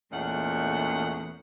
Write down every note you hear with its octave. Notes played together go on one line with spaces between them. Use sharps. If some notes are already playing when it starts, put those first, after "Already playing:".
E2 A#2 G#3 A3 C#4 F#5